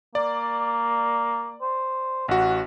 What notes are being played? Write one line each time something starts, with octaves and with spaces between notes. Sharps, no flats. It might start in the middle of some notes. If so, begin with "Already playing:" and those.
A#3 D5
C5
A1 F#4 F#5